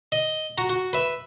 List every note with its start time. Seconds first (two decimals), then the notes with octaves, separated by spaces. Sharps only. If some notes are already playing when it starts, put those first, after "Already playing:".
0.12 D#5
0.58 F#4 A#5
0.69 F#4
0.93 B4 E5